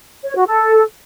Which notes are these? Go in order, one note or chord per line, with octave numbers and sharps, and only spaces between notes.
C#5
F#4
A4